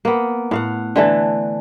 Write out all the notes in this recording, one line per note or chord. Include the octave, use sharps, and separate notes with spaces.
A#3 B3
A2 F5 F#5
D3 E3 A3